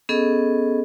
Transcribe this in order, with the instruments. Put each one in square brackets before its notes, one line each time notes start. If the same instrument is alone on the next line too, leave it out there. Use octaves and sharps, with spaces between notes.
[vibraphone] B3 C#4 G#4 A4 D#5